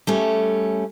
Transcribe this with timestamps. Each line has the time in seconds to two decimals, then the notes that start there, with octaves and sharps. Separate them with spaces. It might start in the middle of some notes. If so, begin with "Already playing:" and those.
0.07 G3 A3 C#4